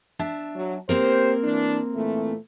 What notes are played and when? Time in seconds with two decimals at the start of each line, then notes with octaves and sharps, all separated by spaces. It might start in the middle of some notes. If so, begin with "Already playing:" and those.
0.19 D4 E5 A5
0.55 F#3
0.89 A#3 C4 G4 A#4 C5
1.43 E3 D4
1.95 A#2 E3 A3